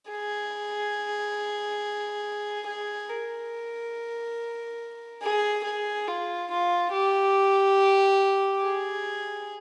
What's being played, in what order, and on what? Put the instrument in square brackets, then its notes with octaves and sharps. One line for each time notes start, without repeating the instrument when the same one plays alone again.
[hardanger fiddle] G#4
G#4
A#4
G#4
G#4
F4
F4
G4
G#4